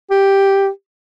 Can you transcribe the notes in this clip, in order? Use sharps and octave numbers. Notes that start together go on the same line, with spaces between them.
G4